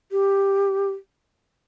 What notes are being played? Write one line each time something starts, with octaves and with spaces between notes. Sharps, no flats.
G4